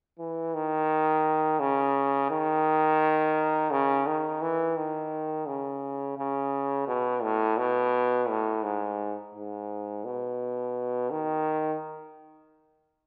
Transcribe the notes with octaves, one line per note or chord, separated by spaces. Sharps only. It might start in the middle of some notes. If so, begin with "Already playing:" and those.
E3
D#3
C#3
D#3
C#3
D#3
E3
D#3
C#3
C#3
B2
A2
B2
A2
G#2
G#2
B2
D#3